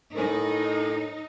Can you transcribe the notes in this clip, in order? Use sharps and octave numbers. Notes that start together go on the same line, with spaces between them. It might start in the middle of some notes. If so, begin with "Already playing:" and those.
A2 D#4 A#4 C5 G#5